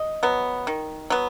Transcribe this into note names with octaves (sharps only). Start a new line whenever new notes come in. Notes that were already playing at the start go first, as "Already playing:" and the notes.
Already playing: D#5
F#3 B3
D#3
F#3 B3